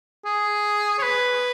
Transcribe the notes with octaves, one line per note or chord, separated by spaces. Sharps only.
G#4
C#5
B4